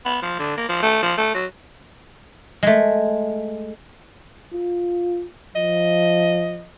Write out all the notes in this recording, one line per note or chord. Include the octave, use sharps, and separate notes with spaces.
B3
F3
D3
A#3
F3
A3
F3
A3
F#3
G#3 A3
F4
F3 D#5